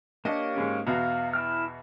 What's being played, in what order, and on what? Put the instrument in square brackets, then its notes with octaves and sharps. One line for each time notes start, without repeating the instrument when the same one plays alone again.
[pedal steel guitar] A#3 G4 C#5 [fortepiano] D4 D#5
[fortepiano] G#2 G#3 C#4
[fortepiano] E2 B2 F#4 [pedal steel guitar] F5 A#5
[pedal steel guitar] E4 G5 F6